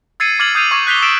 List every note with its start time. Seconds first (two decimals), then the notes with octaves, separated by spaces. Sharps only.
0.20 E6 G#6 A6 C7 C#7 D#7
0.39 D6 F6 G#6 A6 C7 F#7
0.55 D#6 G6 C7 D#7 F7
0.71 C#6 D6 G#6
0.87 F#6 G6 B6 C7 F7 G7
1.02 E6 A6 B6 D7 E7